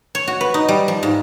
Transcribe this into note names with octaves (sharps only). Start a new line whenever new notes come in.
C#5
F#4
B4
D#4
G3
F3
G#2